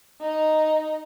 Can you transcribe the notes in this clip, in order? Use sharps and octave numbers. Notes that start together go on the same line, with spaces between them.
D#4